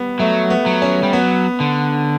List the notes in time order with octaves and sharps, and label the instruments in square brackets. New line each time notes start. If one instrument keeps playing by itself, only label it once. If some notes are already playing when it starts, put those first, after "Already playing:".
Already playing: [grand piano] G3 B3
[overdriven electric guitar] F#3 [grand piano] A3
[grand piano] B3
[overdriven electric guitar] F#3
[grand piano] C#4
[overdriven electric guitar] G3
[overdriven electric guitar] F#3 [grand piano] B3
[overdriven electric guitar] D3